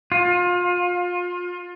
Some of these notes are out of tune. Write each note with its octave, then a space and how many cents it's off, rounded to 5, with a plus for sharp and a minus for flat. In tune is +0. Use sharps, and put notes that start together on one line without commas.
F4 +30